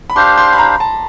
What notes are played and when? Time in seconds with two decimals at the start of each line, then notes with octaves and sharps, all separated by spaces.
0.10 B5
0.16 D4 G4 C5 F5 C6
0.38 C6
0.53 B5
0.58 A#5
0.80 A5